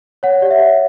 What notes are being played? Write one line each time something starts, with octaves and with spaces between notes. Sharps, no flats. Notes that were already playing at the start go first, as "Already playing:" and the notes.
C#5 F#5
G4 D5
E5
C#5